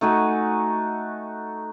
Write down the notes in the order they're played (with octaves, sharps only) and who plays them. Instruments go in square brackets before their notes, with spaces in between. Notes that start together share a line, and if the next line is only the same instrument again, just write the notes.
[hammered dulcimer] A3 D#4 F#4 G#5